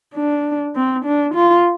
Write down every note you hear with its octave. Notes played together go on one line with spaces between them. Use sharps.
D4
C4
D4
F4